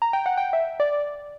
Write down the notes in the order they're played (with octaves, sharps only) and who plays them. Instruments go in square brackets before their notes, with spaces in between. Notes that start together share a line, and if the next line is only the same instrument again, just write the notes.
[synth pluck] A#5
G5
F#5
G5
E5
D5